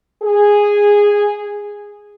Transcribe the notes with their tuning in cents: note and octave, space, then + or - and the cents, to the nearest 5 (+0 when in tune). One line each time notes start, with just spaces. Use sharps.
G#4 -10